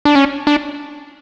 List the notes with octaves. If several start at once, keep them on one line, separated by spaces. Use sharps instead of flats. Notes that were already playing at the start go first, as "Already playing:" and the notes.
D4
C#4
D4